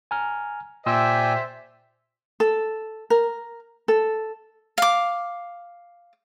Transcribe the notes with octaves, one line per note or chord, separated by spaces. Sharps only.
G#5 A#5 F6
A#2 C5 D5 E5 G5 G#5 C6 E6
A4
A#4
A4
F5 D6